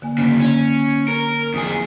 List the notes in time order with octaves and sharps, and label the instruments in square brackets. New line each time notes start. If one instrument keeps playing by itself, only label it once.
[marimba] D3 A#3 G#5
[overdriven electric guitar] F#2 C#3
C#4
A#4
[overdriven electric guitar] F2 G#4 [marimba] D#6